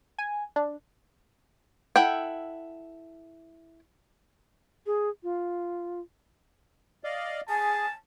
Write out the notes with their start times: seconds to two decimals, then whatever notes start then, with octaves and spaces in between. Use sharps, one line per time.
0.18 G#5
0.56 D4
1.96 E4 A4 F#5 G5
4.86 G#4
5.23 F4
7.04 D5 D#5 F5
7.49 G#4 G#5 A5